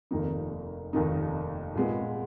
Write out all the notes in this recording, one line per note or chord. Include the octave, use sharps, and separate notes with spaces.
F1 D#2 D#3 A#3 D#4
F1 D#2 D#3 A#3 D#4
A#2 G#3 B3